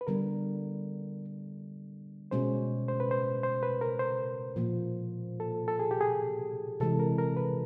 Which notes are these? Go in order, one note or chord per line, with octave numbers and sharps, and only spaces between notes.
B4
D3 G3 B3 A#4
B2 G#3 C#4 C5
C5
B4
C5
C5
B4
A#4
C5
A#2 F3 A#3
A4
A4
G#4
G4
G#4
C3 E3 G#3 A4
A#4
A#4
B4